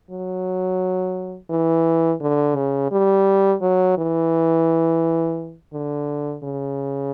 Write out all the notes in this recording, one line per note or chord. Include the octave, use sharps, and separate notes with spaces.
F#3
E3
D3
C#3
G3
F#3
E3
D3
C#3